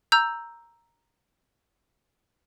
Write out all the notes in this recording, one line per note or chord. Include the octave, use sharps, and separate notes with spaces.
A#5 E6 G6